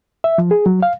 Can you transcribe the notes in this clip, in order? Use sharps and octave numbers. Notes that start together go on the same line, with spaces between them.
E5
F3
G#4
F#3
F5